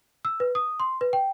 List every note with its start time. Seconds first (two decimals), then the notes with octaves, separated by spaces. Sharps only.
0.25 E6
0.40 B4
0.55 D#6
0.80 C6
1.01 B4
1.13 G5